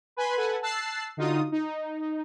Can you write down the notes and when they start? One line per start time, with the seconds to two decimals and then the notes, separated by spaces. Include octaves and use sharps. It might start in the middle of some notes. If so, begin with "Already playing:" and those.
0.17 B4 G#5 B5 C6
0.37 A4 B4 F#5 G#5
0.62 A5 E6 F#6 A6 C7
1.17 D3 D#4 F4 F#4 D#6
1.52 D#4